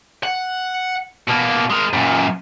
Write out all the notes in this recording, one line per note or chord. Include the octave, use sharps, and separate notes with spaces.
F#5
B2 A#3
G#3 A#4
F#2 A#2